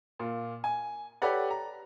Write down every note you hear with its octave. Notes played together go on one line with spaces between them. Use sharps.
A#2 F4
G#5
G4 A4 B4 C#5 D5 F#5
A#5